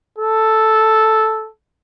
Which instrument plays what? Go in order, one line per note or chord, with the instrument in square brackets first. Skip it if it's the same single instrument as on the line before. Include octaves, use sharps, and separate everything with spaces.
[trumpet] A4